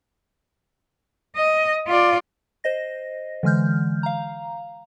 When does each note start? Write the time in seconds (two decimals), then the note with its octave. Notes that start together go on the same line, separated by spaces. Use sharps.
1.36 D#5
1.87 F4 D5
2.64 C5 D#5 A#6
3.43 D3 E3 G#3 F6 G6
4.03 F5 A#5